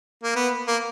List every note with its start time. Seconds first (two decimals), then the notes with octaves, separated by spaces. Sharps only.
0.23 A#3
0.35 B3
0.67 A#3